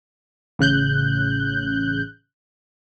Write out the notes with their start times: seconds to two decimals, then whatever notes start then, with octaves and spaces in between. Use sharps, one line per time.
0.59 A1 C#3 F#6 G6